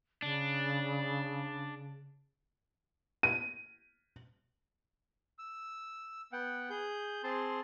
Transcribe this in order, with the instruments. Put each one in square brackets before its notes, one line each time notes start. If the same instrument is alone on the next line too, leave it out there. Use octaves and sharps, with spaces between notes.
[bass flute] C#3 [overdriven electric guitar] D4
[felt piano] D#7
[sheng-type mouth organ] E6
B3 F#5 G5
G#4 G6
C4 G#4 A5 C6